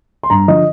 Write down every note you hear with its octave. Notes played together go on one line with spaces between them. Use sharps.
C6
G2 A#5
D3 F3 D#5